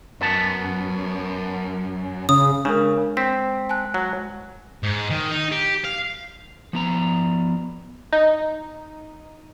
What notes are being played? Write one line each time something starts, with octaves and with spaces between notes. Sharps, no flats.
F#2 F#3 B3 A5
C#3 D#6
C#3 G#3 D4 A#4
C4 B6
G#5 A5 F#6
F#3
G#2
D#3
D#4
G4
F5
F3 B3 A#5
D#4